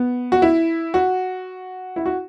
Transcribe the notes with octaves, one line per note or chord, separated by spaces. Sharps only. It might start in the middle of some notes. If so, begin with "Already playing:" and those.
Already playing: B3
F#4
E4
F#4
E4
F#4